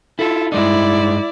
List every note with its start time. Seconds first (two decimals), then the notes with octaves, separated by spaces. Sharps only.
0.19 E4 F4 A4
0.52 G2 G#3 D#4 E4 D5